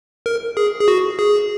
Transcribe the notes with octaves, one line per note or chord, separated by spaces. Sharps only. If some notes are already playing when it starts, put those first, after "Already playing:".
A#4
G#4
G#4
F#4
G#4